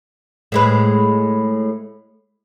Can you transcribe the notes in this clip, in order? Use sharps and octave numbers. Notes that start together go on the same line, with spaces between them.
A2 G#3 B4